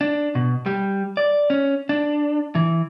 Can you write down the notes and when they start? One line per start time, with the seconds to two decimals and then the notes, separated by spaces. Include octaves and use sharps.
0.01 D4
0.35 B2
0.66 G3
1.17 D5
1.50 C#4
1.89 D4
2.55 E3